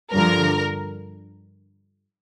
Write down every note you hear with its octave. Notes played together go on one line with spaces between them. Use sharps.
G2 D3 F3 A#4